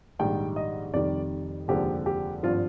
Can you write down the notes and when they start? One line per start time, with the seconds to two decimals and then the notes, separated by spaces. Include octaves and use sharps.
0.19 A#1 G#2 D#3 G3 G5
0.56 D#5
0.94 F1 F2 D#3 G3 D5
1.68 F1 D#2 D3 F3 G#3 G4
2.06 G4
2.43 G#1 G2 F3 F4